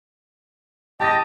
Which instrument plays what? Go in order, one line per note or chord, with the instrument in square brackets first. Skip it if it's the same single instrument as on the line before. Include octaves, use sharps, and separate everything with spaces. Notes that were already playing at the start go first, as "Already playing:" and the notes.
[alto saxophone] G4 [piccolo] D#5 [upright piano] A5 A6 A#6